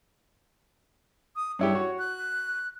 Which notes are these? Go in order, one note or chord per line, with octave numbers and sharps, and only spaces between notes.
D#6
G2 E4 G4 C#5
F#4
F#6